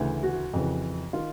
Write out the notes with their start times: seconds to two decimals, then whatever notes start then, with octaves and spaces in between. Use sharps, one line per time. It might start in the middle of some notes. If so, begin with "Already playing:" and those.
Already playing: D2 C#3 E3
0.23 F#4
0.53 F2 C#3 E3
1.13 D#3 F4